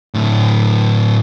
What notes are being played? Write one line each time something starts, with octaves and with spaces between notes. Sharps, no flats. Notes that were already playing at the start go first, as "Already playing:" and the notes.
A2 D3